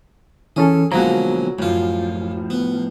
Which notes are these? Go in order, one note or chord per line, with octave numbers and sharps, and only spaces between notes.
E3 C#4 G#4 A4
B2 D3 F3 F#3 G#3 A#3 F#4 A#5
F#2 A2 F3 F4
B3